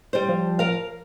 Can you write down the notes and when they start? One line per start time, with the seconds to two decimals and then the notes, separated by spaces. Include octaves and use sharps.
0.13 G3 C5
0.28 F3
0.59 A#4 F5